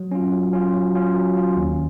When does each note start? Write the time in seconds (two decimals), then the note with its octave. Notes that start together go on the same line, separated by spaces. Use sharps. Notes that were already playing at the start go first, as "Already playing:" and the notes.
Already playing: F#3
0.12 C#4 F4
0.32 F#3
0.53 C#4 F4
0.74 F#3
0.95 C#4 F4
1.15 F#3
1.36 C#4 F4
1.57 D#2